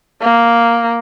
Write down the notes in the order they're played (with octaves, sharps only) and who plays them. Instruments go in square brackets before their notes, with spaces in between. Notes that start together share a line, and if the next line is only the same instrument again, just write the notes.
[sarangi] A#3